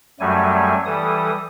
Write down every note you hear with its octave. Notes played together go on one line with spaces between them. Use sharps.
F#2 F#3 G3 A3 G#5
E3 G3 A4 D#6